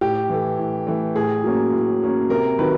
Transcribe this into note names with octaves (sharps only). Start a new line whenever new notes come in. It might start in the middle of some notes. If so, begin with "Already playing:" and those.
A2 G4
E3 A3
A2
E3 A3
A2 G#4
F#3 A#3 C#4
A2
F#3 A#3 C#4
C3 A#4
D#3 F#3 B4